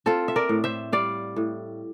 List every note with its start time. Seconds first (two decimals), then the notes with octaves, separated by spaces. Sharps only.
0.06 C4 F4 A4
0.28 E5
0.36 A#4 D5
0.49 A2
0.64 C5 E5
0.92 G3 D5 F5
1.36 A2